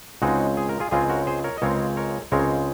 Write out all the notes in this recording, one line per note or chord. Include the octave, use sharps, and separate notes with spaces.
C#2 C#3 G#3 C4 D#4 F#4
G#4
A#4
F4 G#4
C#2 C#3 G#3 C4 F4 G#4
F#4 A#4
G#4 C5
A#4 C#5
D#5
C#2 C#3 G#3 C4 A#4 C#5
A#4 C#5
C#2 C#3 G#3 C4 A#4 C#5